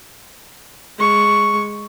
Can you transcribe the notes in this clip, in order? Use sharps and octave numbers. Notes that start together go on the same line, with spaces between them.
G#3 C#6